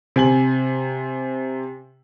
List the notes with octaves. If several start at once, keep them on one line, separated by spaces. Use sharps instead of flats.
C3 G#5 F#7